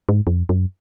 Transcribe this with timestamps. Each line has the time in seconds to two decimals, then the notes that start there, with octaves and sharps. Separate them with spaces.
0.09 G#2
0.27 F2
0.49 F#2